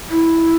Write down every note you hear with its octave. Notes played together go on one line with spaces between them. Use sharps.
E4